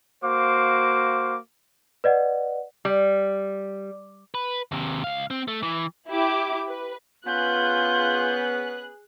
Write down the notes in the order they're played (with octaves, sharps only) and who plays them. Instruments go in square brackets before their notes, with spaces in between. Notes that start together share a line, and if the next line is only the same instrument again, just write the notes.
[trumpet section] A#3 F#4 C5 F5 D6
[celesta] B4 D5 D#5 F#5
[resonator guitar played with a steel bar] G3
[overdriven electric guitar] B4
D#2 C3
C#2 F5
C4
A3
E3
[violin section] E4 G4 D6
B4
[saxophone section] B3 C#4 B4 [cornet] F4 [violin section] G#4 F#6 [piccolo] G6